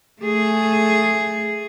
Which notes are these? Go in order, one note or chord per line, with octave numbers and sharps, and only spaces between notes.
A3 G#4